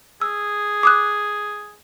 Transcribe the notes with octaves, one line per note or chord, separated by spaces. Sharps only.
G#4 E6
D6 D#6 F#6